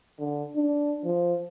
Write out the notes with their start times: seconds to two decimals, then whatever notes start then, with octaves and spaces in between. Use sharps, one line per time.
0.20 D3
0.56 D4
1.05 F3